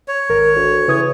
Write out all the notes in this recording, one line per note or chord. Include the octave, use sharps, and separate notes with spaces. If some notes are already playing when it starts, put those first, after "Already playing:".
C#5
G#1 A#4
D2
C#3 E3 D#6 G#6